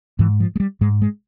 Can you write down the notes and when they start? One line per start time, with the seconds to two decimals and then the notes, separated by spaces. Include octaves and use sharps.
0.19 G#2 E3
0.40 F3
0.56 G#3
0.60 G3
0.81 G#2 G#3
1.02 G#3